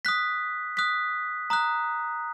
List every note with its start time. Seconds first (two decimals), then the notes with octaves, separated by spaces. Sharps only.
0.05 D#6 F#6 B6
0.77 D#6 F#6 B6
1.50 A#5 D#6 F#6